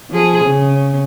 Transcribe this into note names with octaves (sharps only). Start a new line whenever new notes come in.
F3 G#4
C#3